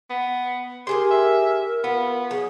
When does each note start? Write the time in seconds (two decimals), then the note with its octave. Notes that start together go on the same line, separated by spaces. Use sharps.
0.10 B3
0.87 G4 G#4 A#4 G#5 C6
1.11 E5
1.84 B3 F4
2.31 F#3 G#4